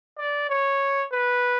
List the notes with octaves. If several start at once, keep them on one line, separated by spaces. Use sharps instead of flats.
D5
C#5
B4